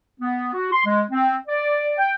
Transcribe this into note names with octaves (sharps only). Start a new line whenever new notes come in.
B3
F#4
C6
G#3
C4
D5
G5